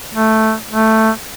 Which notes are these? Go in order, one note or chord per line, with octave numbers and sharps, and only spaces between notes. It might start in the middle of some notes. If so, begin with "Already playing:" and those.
A3
A3